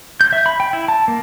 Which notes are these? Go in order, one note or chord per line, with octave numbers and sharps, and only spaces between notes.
G6
E5
B5
G5
E4
A5
A#3